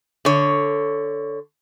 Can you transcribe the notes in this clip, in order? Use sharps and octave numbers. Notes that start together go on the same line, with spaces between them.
D3 C#5